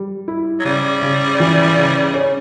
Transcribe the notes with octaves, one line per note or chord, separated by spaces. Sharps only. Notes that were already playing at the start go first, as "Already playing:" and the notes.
Already playing: G3
E4
F#3
C#3 G3
C#3
E3
C#3
C#4